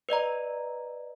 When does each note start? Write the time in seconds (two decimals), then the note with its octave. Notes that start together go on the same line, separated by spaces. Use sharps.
0.09 B4 D5 D#5 A#5